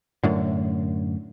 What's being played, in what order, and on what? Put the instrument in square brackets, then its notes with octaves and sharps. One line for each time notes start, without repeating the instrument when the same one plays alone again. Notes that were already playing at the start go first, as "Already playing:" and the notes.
[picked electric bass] F#2 A2 D3